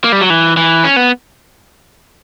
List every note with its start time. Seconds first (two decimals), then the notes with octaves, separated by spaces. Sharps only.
0.04 A#3
0.12 G3
0.21 F#3
0.30 E3
0.57 E3
0.84 C#4
0.96 B3